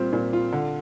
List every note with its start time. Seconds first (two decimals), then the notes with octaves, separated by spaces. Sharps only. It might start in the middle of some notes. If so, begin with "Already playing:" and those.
Already playing: A#2 G3 C4 F4
0.13 A#2
0.33 F4
0.52 D3